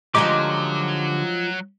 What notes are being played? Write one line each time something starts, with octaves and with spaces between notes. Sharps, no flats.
D3 F3 F#3 G#3 D#4 G4 D6